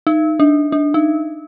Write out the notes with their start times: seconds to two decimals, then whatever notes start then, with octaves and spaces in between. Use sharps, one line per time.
0.07 D#4
0.40 D4
0.72 D4
0.94 D#4